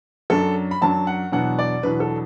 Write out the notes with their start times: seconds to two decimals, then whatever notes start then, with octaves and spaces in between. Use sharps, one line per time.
0.30 F#2 F#3 D4 A4
0.71 B5
0.82 F#2 F#3 D4 A5
1.07 F#5
1.32 E2 B2 F#3 B3 D4 F#5
1.59 D5
1.83 E2 B2 F#3 B3 D4 B4
2.00 A4